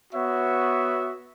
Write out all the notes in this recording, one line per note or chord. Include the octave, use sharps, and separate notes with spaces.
B3 F#4 C#5 E5